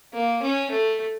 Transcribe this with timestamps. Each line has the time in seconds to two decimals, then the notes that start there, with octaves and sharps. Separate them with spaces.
0.14 A#3
0.43 C#4
0.71 A3